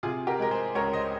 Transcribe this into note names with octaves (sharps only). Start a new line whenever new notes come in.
C3 F4 G#4
G4 A#4
G#3 A#4
G#4 C5
C#2 A#4 C#5
C5 D#5